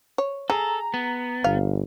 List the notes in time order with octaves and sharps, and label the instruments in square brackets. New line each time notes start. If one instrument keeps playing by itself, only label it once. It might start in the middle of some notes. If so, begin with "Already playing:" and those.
[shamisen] C#5
[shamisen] G#4 [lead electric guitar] A4 [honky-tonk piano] A#5
[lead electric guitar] B3
[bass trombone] G1 [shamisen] F5